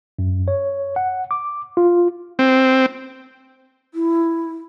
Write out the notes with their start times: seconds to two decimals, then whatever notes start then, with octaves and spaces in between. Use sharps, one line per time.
0.19 F#2
0.48 C#5
0.96 F#5
1.31 D6
1.77 F4
2.39 C4
3.94 E4